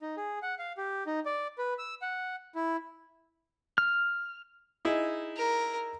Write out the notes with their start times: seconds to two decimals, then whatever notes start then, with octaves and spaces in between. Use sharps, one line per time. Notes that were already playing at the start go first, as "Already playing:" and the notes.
0.01 D#4
0.17 G#4
0.42 F#5
0.59 F5
0.77 G4
1.07 D#4
1.25 D5
1.58 B4
1.79 E6
2.02 F#5
2.55 E4
3.78 F6
4.85 D#4 E4 G#4
5.37 A#4